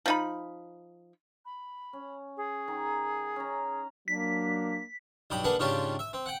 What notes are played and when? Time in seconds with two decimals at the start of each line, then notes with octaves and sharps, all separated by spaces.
0.06 F3 D#4 B5
1.45 B5
1.93 C#4
2.37 G#4
2.68 D#3 D#4
3.36 C#4 A#5
4.08 F#3 A#3 D4 B6
5.30 B1 G2 G4 B5 D#6
5.44 A#3 D4 G#4 B4 F#5
5.59 G#2 C#3 C#4 D4 F4 G4
5.99 E5
6.13 C4
6.26 F#5 G5